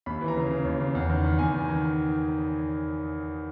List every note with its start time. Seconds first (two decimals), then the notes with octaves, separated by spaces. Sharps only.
0.06 D#2 B5
0.21 E3
0.28 A#5
0.37 C#3
0.51 C#3
0.65 D#2
0.80 C#3
0.95 E2
1.10 D#3
1.24 D#3
1.39 E2 G#5
1.54 D#3
1.69 D#3